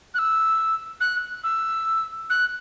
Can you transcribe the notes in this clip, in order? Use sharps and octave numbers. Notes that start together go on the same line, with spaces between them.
F#6
E6
F#6
E6
F#6